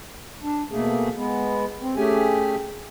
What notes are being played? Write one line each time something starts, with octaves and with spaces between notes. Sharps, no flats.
D4
B2 A3 A#3 G#4
G#3 B3
C4
A3 C#4 G4 G#4 G#5